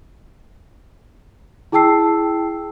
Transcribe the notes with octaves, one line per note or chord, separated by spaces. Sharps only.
E4 G#4 G5 A5 E6 C7